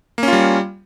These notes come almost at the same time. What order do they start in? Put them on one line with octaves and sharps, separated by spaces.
A#3 C#4 F4 G3